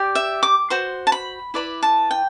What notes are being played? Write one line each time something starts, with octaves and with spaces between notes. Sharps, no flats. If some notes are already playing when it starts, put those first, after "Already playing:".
Already playing: G4 D5
E5
D6
F#4 C5 C6
A5
B5
E4 B4 D5 B5
A5
G5